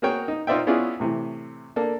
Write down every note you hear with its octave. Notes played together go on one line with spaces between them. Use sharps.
A#3 F#4 G#4 A#4 C#5 G5
D#4
D#4 F4 C5 D5 E5 G5
B3 C#4 E4 F4 G#4 D5
A2 C3 E3
A#3 D4 A4